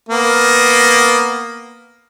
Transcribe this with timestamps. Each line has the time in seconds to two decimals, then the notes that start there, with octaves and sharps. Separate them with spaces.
0.09 A#3 B3